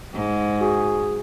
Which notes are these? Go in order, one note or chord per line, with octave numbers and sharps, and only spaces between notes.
G#2
F#4 G#4